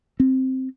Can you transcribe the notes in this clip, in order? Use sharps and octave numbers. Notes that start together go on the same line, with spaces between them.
C4